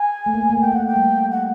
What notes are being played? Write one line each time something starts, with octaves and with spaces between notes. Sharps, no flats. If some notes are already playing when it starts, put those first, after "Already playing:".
Already playing: G#5
A3
A#3
A3
A#3
A3
A#3 G5
A3 F#5
G5
G3
F#5